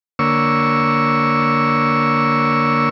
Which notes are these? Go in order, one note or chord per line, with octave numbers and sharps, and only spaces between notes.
D3 A#3 C#5 C#6 E6